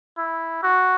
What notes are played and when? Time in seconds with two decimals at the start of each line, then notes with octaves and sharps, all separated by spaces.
0.18 E4
0.63 F#4